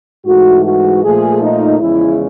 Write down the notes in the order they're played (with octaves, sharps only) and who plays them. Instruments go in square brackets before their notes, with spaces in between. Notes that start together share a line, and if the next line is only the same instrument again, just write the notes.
[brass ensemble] G#2 E3 A3 F#4
F#4
A#2 F3 A3 G#4
D#4
E2 C#3 F3 G#3 E4